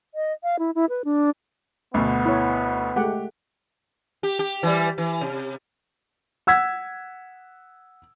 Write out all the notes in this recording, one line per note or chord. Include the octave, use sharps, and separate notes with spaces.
D#5
F5
E4
E4
B4
D4
D2 B2 B3
E4 C#5
G#3 A3 G4 F#5
G4
G4
E3 G3
E3
C3
F#5 E6 G#6 B6